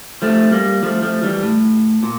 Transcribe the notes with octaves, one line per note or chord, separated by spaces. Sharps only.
F3 A3
G3 A#3
F3 A3
F3 A3
E3 G3
A2
A#2